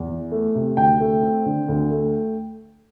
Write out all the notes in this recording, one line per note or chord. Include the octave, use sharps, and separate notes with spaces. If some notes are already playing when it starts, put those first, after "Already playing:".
Already playing: E2
E3
A3
C3
D2 G5
A3
C4
D3
D2
A3